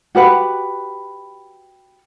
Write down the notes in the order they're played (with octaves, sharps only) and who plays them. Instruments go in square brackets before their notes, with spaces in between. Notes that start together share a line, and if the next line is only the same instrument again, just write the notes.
[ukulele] F#4 G4 B4 F#5